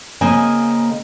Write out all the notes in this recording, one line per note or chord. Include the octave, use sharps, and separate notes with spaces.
C#3 A#3 C4 D#5 G#5